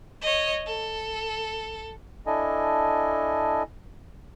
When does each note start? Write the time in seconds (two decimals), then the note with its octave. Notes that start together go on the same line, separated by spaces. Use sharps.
0.22 C#5 D#5
0.66 A4
2.27 D4 E4 A4 D#5 G#5